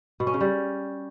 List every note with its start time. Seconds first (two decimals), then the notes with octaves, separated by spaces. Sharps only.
0.20 B2
0.27 C#4
0.34 C#3
0.40 G3